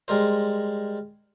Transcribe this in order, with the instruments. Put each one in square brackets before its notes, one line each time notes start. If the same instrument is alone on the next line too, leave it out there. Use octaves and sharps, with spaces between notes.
[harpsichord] G3 G#3 A#4 C5